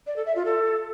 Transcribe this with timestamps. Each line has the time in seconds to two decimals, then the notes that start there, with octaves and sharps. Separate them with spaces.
0.07 D5
0.16 A4
0.26 E5
0.36 F4
0.45 A4